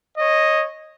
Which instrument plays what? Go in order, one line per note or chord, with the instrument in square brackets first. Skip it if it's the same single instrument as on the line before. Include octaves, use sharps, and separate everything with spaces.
[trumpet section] C#5 D#5